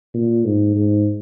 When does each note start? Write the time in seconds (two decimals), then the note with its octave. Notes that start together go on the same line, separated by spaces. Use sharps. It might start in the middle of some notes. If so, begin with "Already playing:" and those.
0.14 A#2
0.44 G#2
0.75 G#2